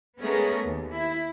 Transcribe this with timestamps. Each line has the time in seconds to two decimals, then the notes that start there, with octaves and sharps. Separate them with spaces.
0.19 G#3 A3 B3 C#4 G#4 A#4
0.63 D#2
0.94 E4